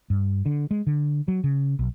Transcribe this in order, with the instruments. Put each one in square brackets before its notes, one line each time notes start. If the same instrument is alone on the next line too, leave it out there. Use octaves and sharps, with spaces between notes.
[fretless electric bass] G2
D3
G#3
D3
F#3
C#3
B1